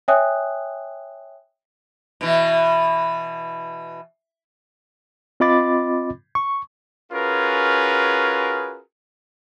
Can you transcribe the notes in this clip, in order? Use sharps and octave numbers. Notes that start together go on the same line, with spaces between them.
C#5 E5 G5 G#5 D#6 F#6
B2 E3
C4 F4 D#5 B5 D6 A6
C#6
C#4 F4 F#4 G#4 A#4 B4